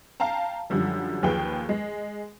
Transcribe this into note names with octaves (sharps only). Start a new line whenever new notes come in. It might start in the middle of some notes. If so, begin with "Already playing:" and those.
F5 G5 A5 A#5
F#2 D3 F3 G3
D#2 F3 G#4 B4 G5
G#3